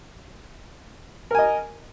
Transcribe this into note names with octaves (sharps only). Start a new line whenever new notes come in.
A#4 D#5 G#5